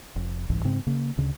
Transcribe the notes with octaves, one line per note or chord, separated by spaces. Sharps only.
F1
G1 C2 G#2 E3
G#2 C#3 C4
C#3 A#3
D2 C#3